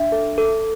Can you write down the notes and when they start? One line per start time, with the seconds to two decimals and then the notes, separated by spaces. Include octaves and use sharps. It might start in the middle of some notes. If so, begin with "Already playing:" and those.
Already playing: D4 E5
0.12 A4
0.38 A4